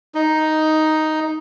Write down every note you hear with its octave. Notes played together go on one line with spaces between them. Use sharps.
D#4